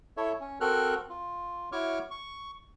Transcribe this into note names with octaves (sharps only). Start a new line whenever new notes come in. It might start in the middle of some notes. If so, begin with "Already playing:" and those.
E4 A4 C#5 E5
C#4
C4 F#4 A4 A#4 F6 F#6
F4
E4 F#4 C#5 C#6 D6 F6
C#6